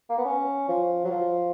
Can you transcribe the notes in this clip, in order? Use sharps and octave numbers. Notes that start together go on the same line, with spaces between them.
A#3
B3
C#4
F3
F#3
F3